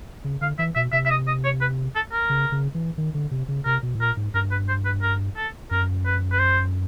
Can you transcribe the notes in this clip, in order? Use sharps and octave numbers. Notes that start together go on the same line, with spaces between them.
C#3
D3 F5
E3 E5
B2 E5
C3 E5
E5
D#5
D#5
C#5
B4
A4
A#4
C#3
C#3
E3
D#3
D3
C3
C#3
C3 A#4
B2
A2
A#2 A#4
G#2
G2 A#4
B4
C5
B4
A#4
A4
F#2 A#4
B4
B4
C5